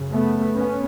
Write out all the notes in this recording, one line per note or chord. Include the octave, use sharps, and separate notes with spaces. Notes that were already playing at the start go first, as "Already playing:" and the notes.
Already playing: F#2 C#3
A3 B3
B3 C#4